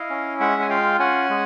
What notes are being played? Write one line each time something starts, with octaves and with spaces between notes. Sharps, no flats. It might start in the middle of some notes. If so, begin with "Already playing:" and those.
Already playing: E4 D#5 F5
C#4
G#3 E5 F#5
G#5
F4 F5 G5
C#4 F#5 G#5
G#3